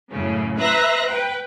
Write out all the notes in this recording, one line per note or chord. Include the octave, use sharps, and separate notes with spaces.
F#2 A2 C#3
B4 C5 E5 A#5 F#6 A#6
B4 G5